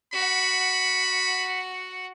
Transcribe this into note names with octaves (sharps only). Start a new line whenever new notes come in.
F#4 F#5 B5